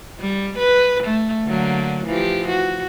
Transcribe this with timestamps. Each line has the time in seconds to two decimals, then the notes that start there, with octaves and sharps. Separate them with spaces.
0.20 G3
0.59 B4
1.04 A3
1.46 D3 F#3 A#3
2.06 E3 F3 G4
2.49 F#4